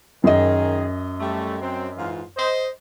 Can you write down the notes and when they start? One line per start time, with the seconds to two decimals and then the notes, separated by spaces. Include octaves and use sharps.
0.24 F#2 D#3 G#4 D#5
1.20 G3 A3
1.60 F#3 C4
1.96 G#2 E3 F4
2.37 C5 D#5